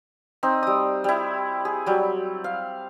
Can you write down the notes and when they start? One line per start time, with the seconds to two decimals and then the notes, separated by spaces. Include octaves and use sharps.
0.43 C4 D#4
0.63 G3 D#6
1.04 G3 E4
1.65 G#4
1.86 F#3 G3
2.44 F5